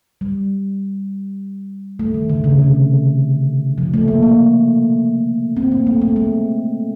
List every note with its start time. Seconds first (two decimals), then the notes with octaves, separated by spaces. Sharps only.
0.21 G3
1.99 A3
2.14 D#3
2.30 D3
2.44 C#3
2.59 C3
3.78 F3
3.94 A3
4.08 A#3
4.23 A#3
5.57 C4
5.72 A#3
5.87 A3
6.02 A3
6.16 G#3